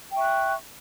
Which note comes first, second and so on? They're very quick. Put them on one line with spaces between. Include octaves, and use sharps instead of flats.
G5 E5 C#6 F#6